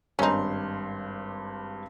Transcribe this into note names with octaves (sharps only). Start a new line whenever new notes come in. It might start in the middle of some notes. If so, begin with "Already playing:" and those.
G#1 G2 C#4 D#4 C6